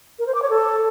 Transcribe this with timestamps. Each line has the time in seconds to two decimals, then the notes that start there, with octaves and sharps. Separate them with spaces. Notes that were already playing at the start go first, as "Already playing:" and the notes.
0.19 A#4
0.27 C5
0.35 D6
0.42 C#5
0.50 A4